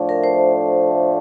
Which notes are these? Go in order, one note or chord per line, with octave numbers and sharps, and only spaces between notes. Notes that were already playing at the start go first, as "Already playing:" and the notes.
Already playing: A2 F3 A3 D4
A#4
C5